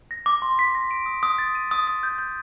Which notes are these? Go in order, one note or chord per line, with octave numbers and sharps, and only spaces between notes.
A#6
D6
C6
B6
A#6
D7
D#6
D#6
A6
D#7
D#6
D#6
G6
G6